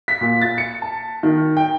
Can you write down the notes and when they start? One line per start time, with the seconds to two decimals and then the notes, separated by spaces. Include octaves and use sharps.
0.08 B6
0.21 A#2
0.41 A6
0.58 C#7
0.82 A5
1.23 D#3
1.57 G5